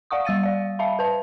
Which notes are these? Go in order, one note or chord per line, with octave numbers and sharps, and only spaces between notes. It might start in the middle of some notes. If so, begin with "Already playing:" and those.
D5 F5 F#5 C#6 D#6
G3 E6 A6 D#7
D5 F5
E5 F5 A5 B5
B4 C5 A5